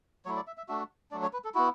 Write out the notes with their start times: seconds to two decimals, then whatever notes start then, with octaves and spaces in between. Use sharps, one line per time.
0.25 F#3 A3 E4 C#5
0.36 D5
0.47 E5
0.57 E5
0.68 A3 D4 F#4 E5
1.11 F#3 A3 D4 D5
1.22 C#5
1.33 B4
1.44 A4
1.54 B3 E4 F#4